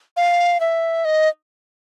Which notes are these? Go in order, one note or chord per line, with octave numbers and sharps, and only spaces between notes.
F5
E5
D#5